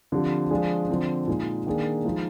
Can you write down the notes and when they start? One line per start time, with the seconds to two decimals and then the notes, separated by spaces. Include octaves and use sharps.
0.12 D3 F3 C4 G4
0.51 F3 G#3 D4 F4 G#4
0.89 D3 F3 C4
1.28 A#2 G#3 D#4 G#4
1.66 D#3 A#3 D4 G#4
2.05 F3 G#3 D#4 G#4